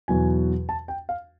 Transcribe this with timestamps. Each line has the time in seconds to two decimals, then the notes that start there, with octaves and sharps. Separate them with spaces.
0.08 E2 B2 F#3 G#5
0.69 A5
0.88 G5
1.09 F5